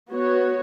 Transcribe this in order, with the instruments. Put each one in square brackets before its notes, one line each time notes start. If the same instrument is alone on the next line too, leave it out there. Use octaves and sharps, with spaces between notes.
[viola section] B3 F#4 C#5